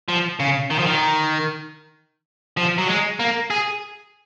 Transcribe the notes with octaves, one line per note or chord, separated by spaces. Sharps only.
F3
C#3
D#3
F3
D#3
F3
F#3
G#3
A#3
G#4